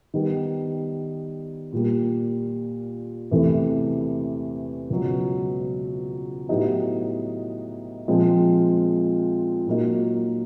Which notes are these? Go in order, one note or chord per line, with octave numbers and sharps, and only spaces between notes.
D#3 G3 B3
A#2 G3 A#3
E2 C3 E3 A3
C#2 B2 F#3
A2 F#3 B3 D#4 G4
A#2 F3 G#3 C4 F4
A#2 F#3 A#3 D#4